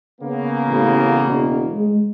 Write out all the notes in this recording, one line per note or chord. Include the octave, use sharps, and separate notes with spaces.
C#3 A#3 B3
A1
E1
G#3